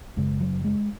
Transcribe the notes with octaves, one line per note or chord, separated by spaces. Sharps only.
F#1 F#2 C#3 G#3
F#3
G#3